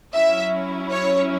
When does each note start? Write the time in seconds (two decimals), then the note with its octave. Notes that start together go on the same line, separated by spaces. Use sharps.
0.14 F#3 C#4 E4 E5
0.91 C#5